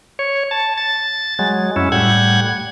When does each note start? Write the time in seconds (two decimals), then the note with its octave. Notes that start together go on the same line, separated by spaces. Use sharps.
0.19 C#5
0.51 A5
0.77 A6
1.39 F#3 G#3
1.76 F#2 C#4 E4
1.92 A2 G3 F#5 G#6